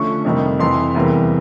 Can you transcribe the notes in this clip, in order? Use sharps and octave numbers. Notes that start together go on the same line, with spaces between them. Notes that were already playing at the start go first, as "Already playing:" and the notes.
Already playing: D3 F3 A3 C#4 C#6
F2 C3 D#3 G3
F2 C3 E3 C6
E2 C3 E3 G3 A#3